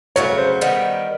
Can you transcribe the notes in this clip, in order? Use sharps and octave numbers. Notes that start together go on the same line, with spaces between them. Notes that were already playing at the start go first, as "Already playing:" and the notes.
C#3 F#3 A3 C#5
C5
D#3 G3 B3